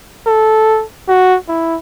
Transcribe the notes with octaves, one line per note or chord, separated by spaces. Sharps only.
A4
F#4
E4